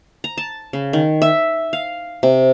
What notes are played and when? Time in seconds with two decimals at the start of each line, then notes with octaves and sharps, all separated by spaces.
0.24 A#5
0.37 A5
0.73 C#3
0.93 D#3
1.22 E5
1.73 F5
2.23 C3